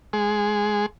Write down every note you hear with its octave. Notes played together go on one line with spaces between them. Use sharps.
G#3 G#4